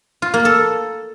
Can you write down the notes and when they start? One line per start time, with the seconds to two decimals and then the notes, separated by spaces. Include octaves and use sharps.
0.22 F4
0.34 A#3
0.45 A4